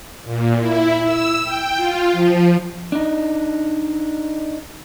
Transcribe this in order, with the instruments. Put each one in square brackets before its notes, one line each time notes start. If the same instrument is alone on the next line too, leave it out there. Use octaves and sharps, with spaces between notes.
[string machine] A#2
E4
E6
G5
F4
F3
[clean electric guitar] D4 D#4